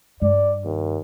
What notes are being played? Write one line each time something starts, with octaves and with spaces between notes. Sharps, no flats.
G2 D5
D#2